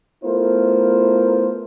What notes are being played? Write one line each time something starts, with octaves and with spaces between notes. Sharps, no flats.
A3 B3 E4 F4 A#4 C5